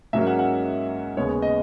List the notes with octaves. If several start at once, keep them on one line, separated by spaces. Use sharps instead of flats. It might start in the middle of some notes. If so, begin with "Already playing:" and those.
G#2 F#3 A#3 C#4 E5
F#5
F#5
D#2 C#3 G#3 B3 C#5
C#5
D#5